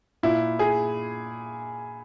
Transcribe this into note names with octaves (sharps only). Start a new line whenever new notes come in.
A#2 E4
G#4